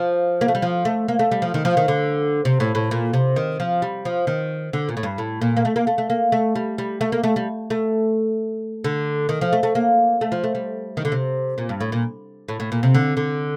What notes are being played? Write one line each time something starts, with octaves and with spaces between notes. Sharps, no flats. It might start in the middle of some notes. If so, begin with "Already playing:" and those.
Already playing: F3
A#3
A3
G3
F3
A3
A#3
A3
G3
F3
D#3
F3
D#3
D3
C3
A2
A2
A#2
C3
D#3
F3
G3
F3
D#3
D3
A#2
A2
G2
A2
A#2
A#3
A3
A#3
A3
A3
A#3
A3
G3
G3
A3
A#3
A3
G3
A3
D3
D#3
F3
A3
A3
A#3
A3
F3
A3
G3
D#3
D3
C3
A#2
G2
A2
A#2
A2
A2
A#2
C3
D3
D3